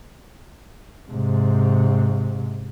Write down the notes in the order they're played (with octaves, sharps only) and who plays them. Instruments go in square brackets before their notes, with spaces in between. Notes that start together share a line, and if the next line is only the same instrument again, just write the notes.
[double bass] G#2 C3